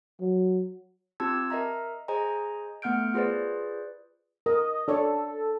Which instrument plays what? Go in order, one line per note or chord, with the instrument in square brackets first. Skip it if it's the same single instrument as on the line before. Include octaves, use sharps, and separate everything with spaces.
[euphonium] F#3
[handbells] C4 F4 G4 A5 E6 G#6
A#4 D#5 E5 A#5
G#4 C5 D#5 G#5 A#5
A3 B3 F#5 F6 G6 D7
F4 G#4 B4 C5 D5
[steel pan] A#4 [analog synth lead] D#5
[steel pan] D4 C#5 D5 [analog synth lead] A4